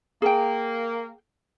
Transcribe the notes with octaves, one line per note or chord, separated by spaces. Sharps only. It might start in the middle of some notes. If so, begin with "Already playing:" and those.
A#3 G#4 G5